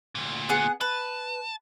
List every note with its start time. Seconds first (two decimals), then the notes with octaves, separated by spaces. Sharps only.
0.15 D2 A#2
0.49 B3 G#4 F#5
0.81 B4 A5